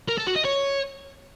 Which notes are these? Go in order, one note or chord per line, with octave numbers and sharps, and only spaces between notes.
A#4
A4
F#4
D#5
C#5